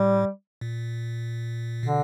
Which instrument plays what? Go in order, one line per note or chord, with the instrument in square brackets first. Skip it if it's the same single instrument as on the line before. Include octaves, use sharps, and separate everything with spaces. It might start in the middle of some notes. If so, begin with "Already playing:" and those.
Already playing: [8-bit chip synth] A2 [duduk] G3
[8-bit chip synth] A#2
[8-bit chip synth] B2 [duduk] D3